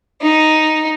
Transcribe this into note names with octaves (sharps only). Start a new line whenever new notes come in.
D#4